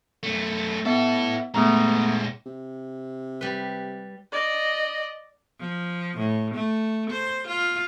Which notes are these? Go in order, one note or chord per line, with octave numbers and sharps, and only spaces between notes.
F#2 A3
B3 E4 A4 E5
A#2 G#3 A3 B3 A#5
C3
G3 B4
D5 D#5
F3
A2
A3
C5
F4